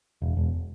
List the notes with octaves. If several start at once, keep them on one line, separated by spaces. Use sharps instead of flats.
E1
E1